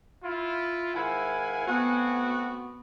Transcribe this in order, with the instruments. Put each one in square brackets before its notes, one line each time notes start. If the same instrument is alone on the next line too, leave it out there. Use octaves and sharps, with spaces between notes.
[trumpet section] E4 F4
[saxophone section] G#2 D#3 E4 [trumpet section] F5 F#5 G#5
[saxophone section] A3 C4 F#4 [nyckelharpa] B3